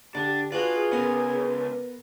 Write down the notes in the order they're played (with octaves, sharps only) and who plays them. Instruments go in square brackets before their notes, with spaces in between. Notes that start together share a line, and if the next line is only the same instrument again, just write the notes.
[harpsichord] D3 [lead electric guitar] D4 [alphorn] G4
[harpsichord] D4 F#4 [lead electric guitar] F4 [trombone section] G#4 [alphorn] B4
[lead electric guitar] C#2 C#4 [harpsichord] B3 A#4